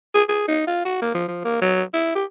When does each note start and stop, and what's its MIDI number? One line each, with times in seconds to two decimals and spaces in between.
0.14 0.23 68
0.29 0.47 68
0.48 0.65 63
0.67 0.83 65
0.85 1.01 66
1.02 1.11 58
1.14 1.28 53
1.28 1.44 53
1.44 1.61 58
1.61 1.83 54
1.93 2.14 64
2.15 2.24 67